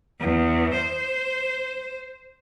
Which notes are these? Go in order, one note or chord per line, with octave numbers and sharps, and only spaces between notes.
E2
C5